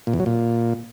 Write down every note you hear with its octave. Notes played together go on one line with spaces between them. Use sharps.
A#2
E2
F#3
A#2